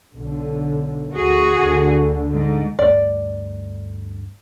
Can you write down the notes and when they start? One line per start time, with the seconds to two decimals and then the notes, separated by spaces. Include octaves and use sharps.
0.14 B1 D3
1.15 D2 F#4 G#4
1.59 D2 D3
2.32 G#2
2.79 D2 G2 A3 D5